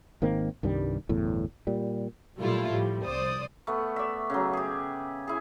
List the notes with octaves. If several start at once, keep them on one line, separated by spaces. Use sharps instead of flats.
G#1 D#3 A#3 C4
C2 G2 D#3 G3
G1 E2 A2
A#2 G3
A#2 F#3 G3 A3 E4 F4
A2 F3 G3
C2 C5 D5 D#6
A3 B3
D5 E5
C#3 F#3
G4 G#4
E4 G#4